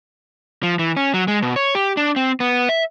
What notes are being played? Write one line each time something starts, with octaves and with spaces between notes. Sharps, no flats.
F3
E3
C#4
F#3
G#3
B2
C#5
G4
D4
C4
B3
E5